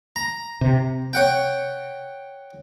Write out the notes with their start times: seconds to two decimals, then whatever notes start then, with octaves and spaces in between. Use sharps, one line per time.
0.16 A#5
0.61 C3
1.13 C#5 F#5 G5